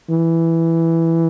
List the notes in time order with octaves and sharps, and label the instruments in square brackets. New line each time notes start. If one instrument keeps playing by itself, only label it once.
[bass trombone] E3